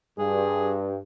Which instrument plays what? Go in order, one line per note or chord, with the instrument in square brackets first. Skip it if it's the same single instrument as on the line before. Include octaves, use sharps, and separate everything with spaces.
[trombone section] G2 [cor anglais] G#4